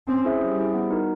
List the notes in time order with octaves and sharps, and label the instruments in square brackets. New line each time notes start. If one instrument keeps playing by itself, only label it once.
[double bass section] C4 [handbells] C#4
[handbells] E4 G#4 C5 E5
[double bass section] G3 [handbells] C#4
[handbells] E4 G#4 C5 E5
B3
D#4 F#4 A#4